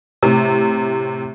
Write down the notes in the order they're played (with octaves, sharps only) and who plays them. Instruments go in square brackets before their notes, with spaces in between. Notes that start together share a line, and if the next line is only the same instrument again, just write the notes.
[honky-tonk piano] A2 C3